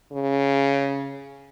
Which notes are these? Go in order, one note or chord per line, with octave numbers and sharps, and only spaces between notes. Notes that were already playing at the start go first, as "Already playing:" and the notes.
C#3